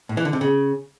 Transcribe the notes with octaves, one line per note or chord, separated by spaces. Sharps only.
A2
E3
D3
C3
C#3